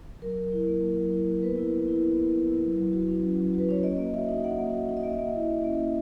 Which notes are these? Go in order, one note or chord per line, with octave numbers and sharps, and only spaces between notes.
F#3 A#4
F#3
E4
A#3
F#3
F#3
E4
A#3
B3 B4
E4
B3
E4
B3
E4
B3
E4
F#3
F#3
F#4
C#4
F#3
F#3
F#4 B4
C#4 C#5
A#3 D#5
A#3
F#4 E5
D#4
A#3 F#5
A#3
F#4
D#4
D#5
A#3 E5
A#3
E4
C#4
A#3
A#3